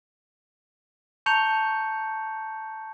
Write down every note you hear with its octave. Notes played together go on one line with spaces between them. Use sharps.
A5 A#5 C#6 G6 C#7 F7